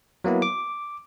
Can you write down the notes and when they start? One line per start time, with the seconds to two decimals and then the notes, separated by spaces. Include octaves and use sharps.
0.24 F#3 A#3 B3 E4
0.42 D6